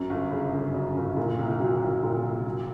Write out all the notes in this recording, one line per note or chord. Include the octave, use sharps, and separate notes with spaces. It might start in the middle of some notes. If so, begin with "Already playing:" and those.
Already playing: F#2
G1
C#3
G1
F#2
G1
A#2
C2
F#3
C2
A#2
C2
F#3